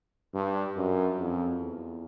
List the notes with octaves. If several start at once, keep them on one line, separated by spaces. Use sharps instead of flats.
G2
F#2
F2
E2